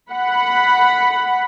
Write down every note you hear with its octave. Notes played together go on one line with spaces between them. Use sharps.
F#5 B5